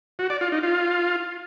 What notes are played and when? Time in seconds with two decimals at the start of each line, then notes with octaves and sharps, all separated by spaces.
0.19 F#4
0.30 D5
0.41 F4
0.52 D#4
0.63 F4